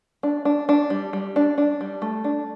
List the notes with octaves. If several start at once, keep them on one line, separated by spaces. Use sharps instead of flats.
D4
D4
D4
G3
G3
D4
D4
G3
A3
D4